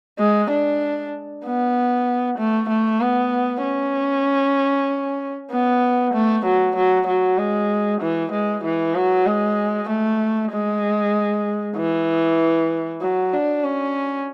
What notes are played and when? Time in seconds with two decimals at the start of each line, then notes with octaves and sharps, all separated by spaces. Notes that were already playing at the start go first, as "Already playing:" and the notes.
0.19 G#3
0.50 D4
1.45 B3
2.38 A3
2.69 A3
3.01 B3
3.63 C#4
5.51 B3
6.13 A3
6.45 F#3
6.76 F#3
7.07 F#3
7.38 G#3
8.01 E3
8.32 G#3
8.64 E3
8.95 F#3
9.26 G#3
9.89 A3
10.51 G#3
11.76 E3
13.02 F#3
13.33 D4
13.64 C#4